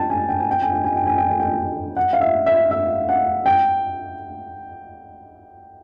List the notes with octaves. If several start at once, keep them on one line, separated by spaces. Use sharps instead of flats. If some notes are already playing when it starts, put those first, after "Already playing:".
Already playing: G5 A5
G#5
G5
G#5
G5
G#5
G5
G#5
G5
G#5
G5
G#5
G5
F#5
F5
E5
E5
E5
F#5
G5